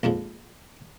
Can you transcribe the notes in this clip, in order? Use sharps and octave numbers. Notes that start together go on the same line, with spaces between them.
A#1 F2 G#2 F3